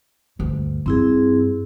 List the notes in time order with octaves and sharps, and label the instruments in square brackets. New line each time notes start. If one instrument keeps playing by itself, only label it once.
[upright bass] D2 G2
[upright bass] G2 [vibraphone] C4 E4 G#4